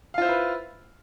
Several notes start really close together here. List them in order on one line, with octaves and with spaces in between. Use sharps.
F5 F4 C5 E4 B4